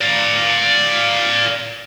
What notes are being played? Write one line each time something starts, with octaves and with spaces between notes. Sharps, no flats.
D5 F5